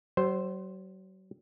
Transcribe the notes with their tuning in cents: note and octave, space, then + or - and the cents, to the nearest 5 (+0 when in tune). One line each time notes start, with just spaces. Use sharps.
F#3 +40 C5 +0